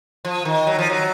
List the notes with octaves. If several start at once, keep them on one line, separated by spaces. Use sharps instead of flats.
F3
D#3
F#3
F3
F#3